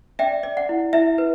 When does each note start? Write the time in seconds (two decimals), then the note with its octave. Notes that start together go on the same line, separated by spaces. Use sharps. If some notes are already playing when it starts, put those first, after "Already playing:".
0.19 D5 E5 G5
0.43 D5
0.57 F#5
0.69 E4
0.93 E4 E5
1.18 B4